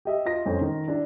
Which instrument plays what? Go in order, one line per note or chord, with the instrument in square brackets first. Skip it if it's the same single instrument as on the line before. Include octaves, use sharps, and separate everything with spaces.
[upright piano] G4 D#5 E5
F4 D#5 A#6
F2 C4 C#4
D#3
D4 E4